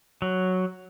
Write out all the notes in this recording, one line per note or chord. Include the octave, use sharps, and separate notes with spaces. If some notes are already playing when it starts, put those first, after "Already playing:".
F#3